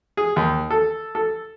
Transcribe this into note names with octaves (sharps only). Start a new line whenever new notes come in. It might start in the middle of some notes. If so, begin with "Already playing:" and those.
G#4
D#2
A4
A4